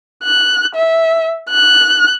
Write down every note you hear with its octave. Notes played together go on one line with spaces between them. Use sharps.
F#6
E5
F#6